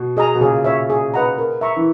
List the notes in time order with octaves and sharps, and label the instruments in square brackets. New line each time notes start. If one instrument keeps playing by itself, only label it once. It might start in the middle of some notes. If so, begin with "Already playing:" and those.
Already playing: [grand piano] B2
[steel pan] G#4 D#5 A#5
[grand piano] B2
[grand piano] A#2 C#3 [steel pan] G#4
[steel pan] C#5 E5
G#4
B4 D#5 F#5 A#5
A#4
E5 A#5 C#6
[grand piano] E3